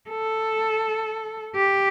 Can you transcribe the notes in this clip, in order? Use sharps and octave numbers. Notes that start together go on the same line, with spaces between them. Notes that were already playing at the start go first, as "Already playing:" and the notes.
A4
G4